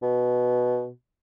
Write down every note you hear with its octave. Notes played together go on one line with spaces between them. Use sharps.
B2